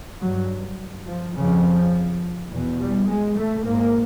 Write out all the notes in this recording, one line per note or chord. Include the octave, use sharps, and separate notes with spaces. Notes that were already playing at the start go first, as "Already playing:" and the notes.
G2 F#3
F3
F2 C#3 F3
E2 B2
G3
G#3
A3
G#2 A#3